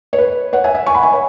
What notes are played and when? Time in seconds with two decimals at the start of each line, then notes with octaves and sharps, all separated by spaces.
0.13 C#5
0.18 B4
0.53 C#5 F#5
0.64 E5 G#5
0.75 E5 G#5
0.86 G#5 C#6
0.95 F#5 B5
1.03 E5 G#5
1.12 C#5